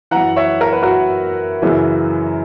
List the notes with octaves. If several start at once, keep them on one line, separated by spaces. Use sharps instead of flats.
F#2 E3 F#5 A#5
C#5 E5
A#4
B4
F#4 A#4
F#2 C#3 E3